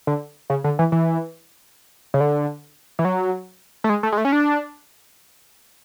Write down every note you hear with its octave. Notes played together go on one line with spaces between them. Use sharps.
D3
C#3
D3
E3
E3
C#3
D3
E3
F#3
A3
G#3
A3
G#3
A3
C#4
D4